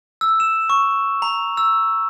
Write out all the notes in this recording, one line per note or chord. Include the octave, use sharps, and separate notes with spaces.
E6
E7
C#6
A#5
E6